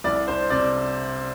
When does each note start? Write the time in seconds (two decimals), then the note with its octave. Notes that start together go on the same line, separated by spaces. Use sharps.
0.04 C2 D5
0.27 D4 C5
0.50 C3 D5